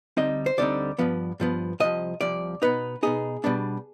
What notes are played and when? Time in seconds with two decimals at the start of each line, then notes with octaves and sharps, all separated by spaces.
0.17 D2 D3 G3 C4 D#4 D#5
0.46 C5
0.57 D2 D3 G3 C4 D#4 D5
0.98 G2 F3 B3
1.40 G2 F3 B3
1.80 C2 C3 F3 D#5
2.21 C2 C3 F3 D5
2.62 B2 B3 D#4 B4
3.03 B2 B3 D#4 G#4
3.44 B2 G3 B3 D4